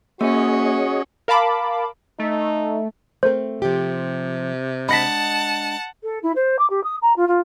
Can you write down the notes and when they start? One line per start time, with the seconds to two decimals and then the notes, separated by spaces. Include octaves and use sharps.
0.21 A#3 C#4 F#4 G#4 C#5 D#5
1.28 A#4 F5 A5 B5 D6
2.19 A3 D#4
3.23 A3 C4 A#4 C5
3.62 C3 F3 G4
4.89 G#3 D4 D#5 F#5 A5 B5 A#6 B6
6.03 A4
6.23 E4
6.36 C5
6.59 D6
6.70 G4
6.84 D#6
7.02 A#5
7.17 F4
7.28 F4